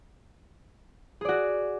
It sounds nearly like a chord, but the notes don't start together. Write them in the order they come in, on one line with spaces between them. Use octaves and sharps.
G#4 D5 F#4